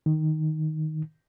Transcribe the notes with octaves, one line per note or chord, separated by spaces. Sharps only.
D#3